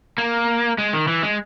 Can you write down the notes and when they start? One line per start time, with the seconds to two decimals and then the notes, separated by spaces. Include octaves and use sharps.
0.18 A#3
0.78 G#3
0.93 D#3
1.08 E3
1.23 G#3